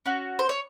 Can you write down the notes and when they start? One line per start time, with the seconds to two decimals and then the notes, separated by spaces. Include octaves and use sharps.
0.06 C#4 F#4
0.39 C5
0.49 C#5